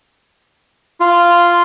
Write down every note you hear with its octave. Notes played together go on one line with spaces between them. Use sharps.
F4